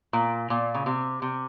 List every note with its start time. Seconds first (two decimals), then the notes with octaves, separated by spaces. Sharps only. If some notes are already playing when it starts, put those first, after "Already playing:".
0.13 A#2
0.50 A#2
0.74 C#3
0.86 C3
1.22 C3